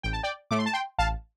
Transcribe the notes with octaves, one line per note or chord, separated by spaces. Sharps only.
A1 G5
A5
D5 G5
A2 A3 D6
C6
A5
G5 C6
A1 F5 A5